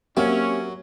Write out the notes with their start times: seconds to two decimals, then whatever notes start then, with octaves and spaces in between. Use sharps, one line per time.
0.17 F#3 A#3 C4 C#4 G4 E5